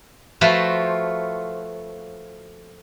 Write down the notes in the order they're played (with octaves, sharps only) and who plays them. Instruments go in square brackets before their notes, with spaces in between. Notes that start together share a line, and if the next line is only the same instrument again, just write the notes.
[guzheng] F3 A3 F4 F#4 B4 C5